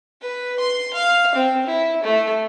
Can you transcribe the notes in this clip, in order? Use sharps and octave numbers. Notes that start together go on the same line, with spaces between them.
B4
C6
F5
C4
E4
A3